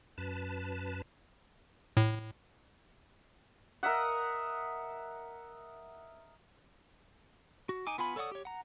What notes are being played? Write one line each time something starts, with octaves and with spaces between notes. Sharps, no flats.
F#2 B4 A5
A2
A#4 D#5 E5 F#5
F#4
D#4 G#5 D6
B3 F4 G#5 B5
A4 C#5 D5 F#5 D#6
G4 C#5
F#5 A#5